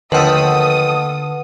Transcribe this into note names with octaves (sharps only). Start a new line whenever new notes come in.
D#2 D3 F3 A3 A4 B4 F#5 D#6